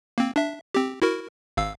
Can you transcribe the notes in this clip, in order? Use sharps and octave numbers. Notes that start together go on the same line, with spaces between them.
A#3 C4
D4 E5
C4 G4
E4 F#4 A#4
G#1 F5 E6